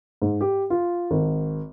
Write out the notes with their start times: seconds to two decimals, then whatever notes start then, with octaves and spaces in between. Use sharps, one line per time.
0.22 G#2
0.41 G4
0.70 F4
1.11 G#1